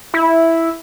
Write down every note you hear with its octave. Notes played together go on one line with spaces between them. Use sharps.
E4